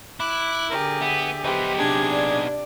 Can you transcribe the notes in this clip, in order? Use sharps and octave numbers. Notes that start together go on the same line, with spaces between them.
E4 D6 F#6
D3 G4 G#4 A#4
B3 E5
B3 D#4 G4 B4 C5 E5
C3 D4 G#4 G#6
D5